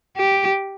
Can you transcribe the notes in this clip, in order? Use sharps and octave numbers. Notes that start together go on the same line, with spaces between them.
G4